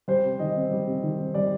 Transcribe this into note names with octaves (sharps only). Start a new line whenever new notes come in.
G3 C5
C3
D#3 D#5
C4
G3
C3
D#3
C4
G3 D5